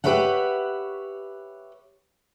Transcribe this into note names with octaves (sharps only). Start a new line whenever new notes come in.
G4 A4 B4 C#5 E5 F#5